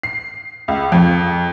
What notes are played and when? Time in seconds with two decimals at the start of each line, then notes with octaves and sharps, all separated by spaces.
0.03 C7
0.68 C#2
0.92 F2